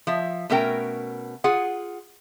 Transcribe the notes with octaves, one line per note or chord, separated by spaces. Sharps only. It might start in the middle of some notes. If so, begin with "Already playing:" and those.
F3 E5
B2 A3 C#4 A#4 G5
F4 G#4 F#5